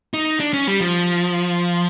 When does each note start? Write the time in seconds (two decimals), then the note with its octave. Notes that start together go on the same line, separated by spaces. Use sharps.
0.14 D#4
0.40 D4
0.53 C#4
0.67 G3
0.81 F3